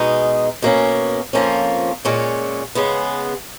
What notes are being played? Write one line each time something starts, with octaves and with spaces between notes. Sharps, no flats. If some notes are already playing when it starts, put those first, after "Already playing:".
Already playing: B2 G#3 D#4
B2 A#3 C#4
F2 F3 A#3 C#4
A#2 G#3 C#4
C#3 G#3 B3